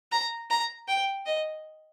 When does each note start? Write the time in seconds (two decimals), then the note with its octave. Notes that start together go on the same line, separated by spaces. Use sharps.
0.12 A#5
0.50 A#5
0.88 G5
1.26 D#5